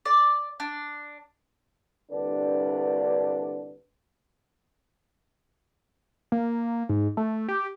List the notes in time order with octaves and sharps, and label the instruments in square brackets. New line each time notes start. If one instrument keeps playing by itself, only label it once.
[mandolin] D5
D4
[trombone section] C2 G2 D3 D4 B4
[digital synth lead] A#3
G#2
A3
G4